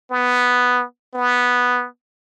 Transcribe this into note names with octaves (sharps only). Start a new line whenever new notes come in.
B3
B3